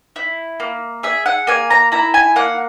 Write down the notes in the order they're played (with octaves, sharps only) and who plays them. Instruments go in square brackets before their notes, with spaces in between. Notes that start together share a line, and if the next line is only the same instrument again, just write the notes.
[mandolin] E4
A#3
G#4 E5
F#5
A#3 G#5
A#5
E4 A#5
G#5
A#3 F#5